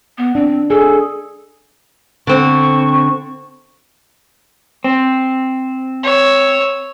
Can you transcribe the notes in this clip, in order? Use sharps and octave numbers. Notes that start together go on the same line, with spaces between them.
B3
C4 D4
G#4 A4
D3 C4 C#6
C4
C#5 E6